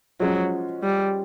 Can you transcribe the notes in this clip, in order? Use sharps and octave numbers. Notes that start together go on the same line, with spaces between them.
F3 F#3 G#3 C#4
G3